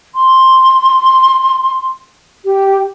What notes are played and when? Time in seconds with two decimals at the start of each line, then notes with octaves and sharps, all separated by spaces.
0.15 C6
2.45 G4